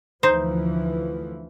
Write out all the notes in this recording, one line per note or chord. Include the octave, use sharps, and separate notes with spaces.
D2 E3 F3 D#4 C5